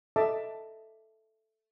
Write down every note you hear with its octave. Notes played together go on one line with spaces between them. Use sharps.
A4 D#5 E5 A5 D6